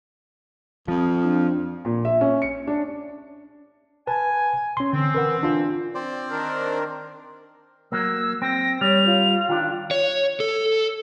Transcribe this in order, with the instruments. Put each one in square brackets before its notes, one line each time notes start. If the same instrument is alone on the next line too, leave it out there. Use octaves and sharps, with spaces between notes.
[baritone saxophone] F2 [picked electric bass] F3 [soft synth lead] D#6
[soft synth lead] D4
[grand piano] A#2
E5
C#4
C#7
D4
[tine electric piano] B4 A5 [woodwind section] G#5
[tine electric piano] C#4 C6
[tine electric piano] D3 [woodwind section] E3 C4
[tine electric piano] A#4 B4 F#5
D4 F4
[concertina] C4 C5 D5
[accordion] D#3 D4 A#4
[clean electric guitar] F#3 A#3 [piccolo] E6
[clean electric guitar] C4 [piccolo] A#6
[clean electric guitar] G3 [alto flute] C#5 [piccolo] F7
[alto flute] F4
[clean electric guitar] D#3 D4
[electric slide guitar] C#5
A4